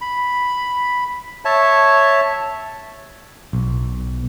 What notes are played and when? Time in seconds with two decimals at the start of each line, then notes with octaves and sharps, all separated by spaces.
0.01 B5
1.45 C#5 E5 A5
3.53 B1